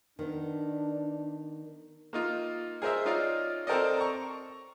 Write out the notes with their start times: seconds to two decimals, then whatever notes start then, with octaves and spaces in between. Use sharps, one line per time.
0.19 D#3 B3 D4
2.13 A#3 D#4 F4
2.82 G#4 A#4 C5 D#5 E5
3.05 C#4 D#4 F4 D5 D#5 F5
3.67 C4 A4 A#4 C5 D5 D#5
3.97 A#5 C#6